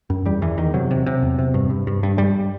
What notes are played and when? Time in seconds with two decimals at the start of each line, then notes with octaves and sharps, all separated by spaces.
0.10 F#2
0.25 E2 G3
0.42 E2 E3
0.57 E2 D#3
0.74 C3 F#3
0.91 C3
1.06 C3
1.22 E2
1.39 C3
1.54 G2
1.70 G2
1.87 G2
2.03 G2
2.18 G2 G3